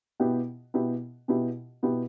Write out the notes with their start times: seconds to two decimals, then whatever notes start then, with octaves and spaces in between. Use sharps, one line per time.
0.20 B2 B3 E4 G4
0.74 B2 B3 E4 G4
1.28 B2 B3 E4 G4
1.83 B2 B3 E4 G4